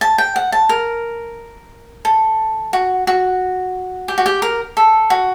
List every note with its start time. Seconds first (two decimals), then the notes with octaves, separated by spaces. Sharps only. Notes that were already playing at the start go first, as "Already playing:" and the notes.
0.01 A5
0.18 G5
0.36 F#5
0.52 A5
0.69 A#4
2.05 A4
2.73 F#4
3.07 F#4
4.08 G4
4.18 F#4
4.26 G4
4.42 A#4
4.77 A4
5.10 F#4